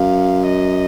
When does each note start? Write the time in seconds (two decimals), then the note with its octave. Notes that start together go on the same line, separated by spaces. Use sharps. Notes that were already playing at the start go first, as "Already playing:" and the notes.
Already playing: F#2 F5
0.47 D#5